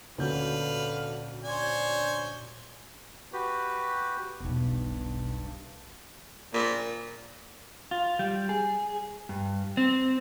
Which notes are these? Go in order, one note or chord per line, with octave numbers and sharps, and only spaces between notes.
D2 A#2 D3 C#4 F#4 B4 F5 G6
D4 C5 C#5 G#5
F#4 G4 B4
E1 B1 G2
A#2
F4
G3
G#4
G2
C4